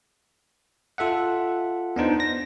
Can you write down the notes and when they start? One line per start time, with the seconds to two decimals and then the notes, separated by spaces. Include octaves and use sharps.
0.98 F4 A4 E5 F#5
1.96 B3 D4 D#4 C5
2.20 A#6